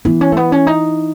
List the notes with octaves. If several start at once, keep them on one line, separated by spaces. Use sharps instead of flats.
E3 B3
C#4
A3
B3
C#4
D#4